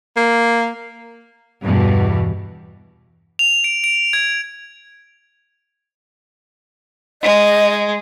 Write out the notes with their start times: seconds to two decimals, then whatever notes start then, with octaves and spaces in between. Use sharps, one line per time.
0.16 A#3
1.62 E2 G2 B2 E3
3.39 F7
3.64 D7
3.84 D7
4.13 G#6
7.23 G#3 D#5